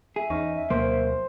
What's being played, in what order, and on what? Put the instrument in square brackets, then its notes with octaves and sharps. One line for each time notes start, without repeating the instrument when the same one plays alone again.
[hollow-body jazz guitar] G#4 [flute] E5
[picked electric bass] E2 [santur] C#4 [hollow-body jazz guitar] D#4
[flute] E5
[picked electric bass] D2 B2 F#3 [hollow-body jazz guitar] A#3 [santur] C5